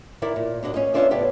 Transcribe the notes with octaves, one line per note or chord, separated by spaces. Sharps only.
D#3 E4 A#4 D5
A#2
D#2 D4 F#4 D#5
C#4 D#4 G#4 D#5
B3 C#4 D4 F4 D5 E5
A2 C#3 B3 D4 G4